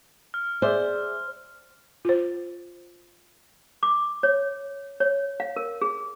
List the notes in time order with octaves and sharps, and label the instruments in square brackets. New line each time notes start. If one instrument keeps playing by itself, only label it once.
[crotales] F6
[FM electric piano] G#4 D5 E5 [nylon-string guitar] C5
[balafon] F4 C5
[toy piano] D6
C#5
C#5
F5
A#4
G#4